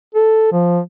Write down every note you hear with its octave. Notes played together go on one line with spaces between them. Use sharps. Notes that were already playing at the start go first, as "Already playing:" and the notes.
A4
F3